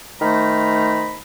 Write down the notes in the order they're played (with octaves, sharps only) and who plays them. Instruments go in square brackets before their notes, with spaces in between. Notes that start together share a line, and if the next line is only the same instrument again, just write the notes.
[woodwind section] D#3 A3 C5 A#5 B5